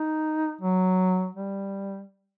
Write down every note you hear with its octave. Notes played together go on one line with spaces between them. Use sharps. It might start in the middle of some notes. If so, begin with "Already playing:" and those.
Already playing: D#4
F#3
G3